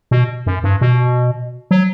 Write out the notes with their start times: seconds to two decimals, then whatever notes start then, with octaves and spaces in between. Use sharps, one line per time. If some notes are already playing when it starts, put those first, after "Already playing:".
0.11 B2
0.47 F#2
0.64 G2
0.81 B2
1.71 F#3